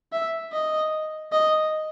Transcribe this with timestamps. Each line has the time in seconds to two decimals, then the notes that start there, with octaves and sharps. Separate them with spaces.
0.12 E5
0.52 D#5
1.32 D#5